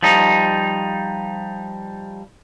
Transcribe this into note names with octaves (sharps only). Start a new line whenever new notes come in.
F3 G3 D#4